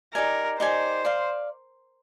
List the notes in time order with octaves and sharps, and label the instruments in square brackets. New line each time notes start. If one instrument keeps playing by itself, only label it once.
[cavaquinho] D#4 G4 D5 G#5 [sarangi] A#4
[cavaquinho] D#4 G4 D5 G#5 [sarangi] C5
[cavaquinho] D5 F5 C6